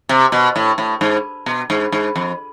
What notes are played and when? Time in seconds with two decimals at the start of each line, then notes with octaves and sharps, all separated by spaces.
0.09 C3
0.32 B2
0.56 A2
0.78 A2
1.01 G#2
1.46 B2
1.70 G#2
1.92 G#2
2.16 F2